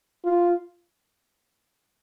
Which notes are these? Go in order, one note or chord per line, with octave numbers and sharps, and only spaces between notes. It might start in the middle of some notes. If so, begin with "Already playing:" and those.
F4